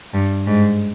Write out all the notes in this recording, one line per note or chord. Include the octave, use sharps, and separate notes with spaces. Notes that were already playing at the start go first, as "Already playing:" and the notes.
G2
G#2